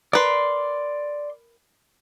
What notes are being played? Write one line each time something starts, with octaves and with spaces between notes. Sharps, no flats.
A#4 B4 D5 C6